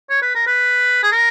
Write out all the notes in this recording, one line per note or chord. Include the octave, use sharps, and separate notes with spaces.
C#5
B4
A#4
B4
G#4
A#4